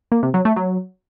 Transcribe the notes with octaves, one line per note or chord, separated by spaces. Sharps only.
A#3
C3
F#3
A3
F#3